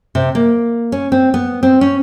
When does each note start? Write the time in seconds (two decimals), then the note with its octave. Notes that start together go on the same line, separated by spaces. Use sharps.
0.15 C3
0.35 A#3
0.92 C#4
1.12 C4
1.34 B3
1.63 C4
1.81 C#4